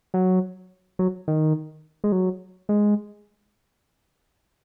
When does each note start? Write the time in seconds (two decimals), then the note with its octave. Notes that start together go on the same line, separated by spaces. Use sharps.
0.14 F#3
0.99 F#3
1.28 D#3
2.04 G#3
2.12 F#3
2.69 G#3